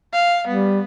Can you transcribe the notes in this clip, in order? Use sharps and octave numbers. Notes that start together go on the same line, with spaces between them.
F5
G3 B3